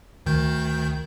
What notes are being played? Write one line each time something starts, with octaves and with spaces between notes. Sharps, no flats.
D2 D#3 G6